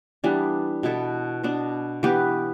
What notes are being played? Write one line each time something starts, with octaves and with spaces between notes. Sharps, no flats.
E3 G3 B3 D4
B2 B3 E4 A4
B2 B3 D4
E3 B3 G4 B4